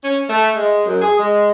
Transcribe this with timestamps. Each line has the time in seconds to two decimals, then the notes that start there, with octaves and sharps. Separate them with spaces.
0.03 C#4
0.28 A3
0.57 G#3
0.86 F#2
1.01 G#4
1.18 G#3